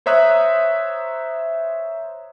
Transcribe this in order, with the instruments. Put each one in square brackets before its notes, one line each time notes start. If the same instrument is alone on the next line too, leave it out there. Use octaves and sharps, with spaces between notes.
[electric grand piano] C5 C#5 E5 A#5 D#6 F#6